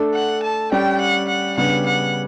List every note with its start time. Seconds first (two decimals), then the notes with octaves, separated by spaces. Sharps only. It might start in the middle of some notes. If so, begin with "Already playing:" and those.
Already playing: A3 D4 A4
0.14 F#5
0.43 A5
0.72 G3 C#4 G4 D5 G5
1.01 F#5
1.29 F#5
1.57 C#3 G3 B3 D4 F#5
1.86 F#5